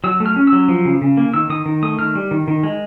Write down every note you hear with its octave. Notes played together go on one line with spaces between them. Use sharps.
F#3 E6
A3
F6
C#4
E6
F#3
F3
C#3
C#3
A#3
D#3 E6
D#3 D#6
D#3
A3 D#6
D#3 F6
G3
D#3
D#3
G#3